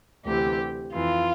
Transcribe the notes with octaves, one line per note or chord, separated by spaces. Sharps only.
D2 C3 E3 G4
F2 E3 F4